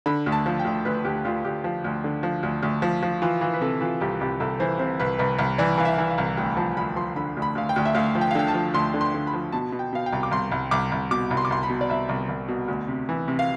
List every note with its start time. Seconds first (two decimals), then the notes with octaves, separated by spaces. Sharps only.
0.06 D3 B5
0.26 D2
0.32 A5
0.46 F3
0.59 G5
0.65 D2
0.85 D2 B4
1.05 D2 G4
1.25 D2 F4
1.44 D2 G4
1.64 F3
1.84 D2
2.04 D3
2.23 F3
2.43 D2
2.63 D2
2.82 F3
3.03 F3
3.22 E3 F4
3.41 E3 F4
3.53 B4
3.61 C3 A4
3.81 E3 F4
4.01 C2 G4
4.21 C2 G4
4.40 C2 A4
4.60 E3 C5
4.79 C3 C5
5.00 C2 B4
5.19 C2 B4
5.39 C2
5.58 E3 D5
5.78 E3 F5
5.85 E5
5.98 E3
6.11 F5
6.18 C2
6.37 D2 G5
6.57 F3 A5
6.77 D2 B5
6.96 F3 C6
7.16 D3 B5
7.37 D2
7.42 B5
7.55 D2 F5
7.69 G5
7.76 D2
7.85 E5
7.95 D2 F5
8.15 F3
8.21 G5
8.31 F5
8.35 D3 G5
8.48 A5
8.54 F3
8.74 D2 C6
8.94 D3
9.01 C6
9.14 D3
9.27 B5
9.34 F3
9.52 B2 A5
9.72 B2
9.79 G5
9.93 B2 F5
10.06 G5
10.13 C2
10.23 D6
10.31 C2 C6
10.52 C2
10.71 C2 D6
10.92 C2
11.11 B2 D6
11.31 C2
11.37 C6
11.45 D6
11.51 C2 C6
11.63 B5
11.69 B2
11.81 D5
11.89 C2 E5
12.09 C2
12.29 C2
12.48 B2
12.68 D2
12.88 C3
13.09 E3
13.28 C3
13.39 F5